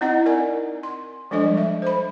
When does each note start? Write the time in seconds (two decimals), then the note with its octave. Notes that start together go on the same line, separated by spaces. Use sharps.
0.01 C4 D#4 E4 D#5 F#5 A#5
0.26 A#4 D5 G#5
0.83 C6
1.31 F3 G3 G#3 D4 A4 D#5
1.57 E5
1.82 C5 B5